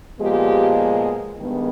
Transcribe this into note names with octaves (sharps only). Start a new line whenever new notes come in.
A#2 F3 G#3 B3 G4
G2 D#3 G#3 B3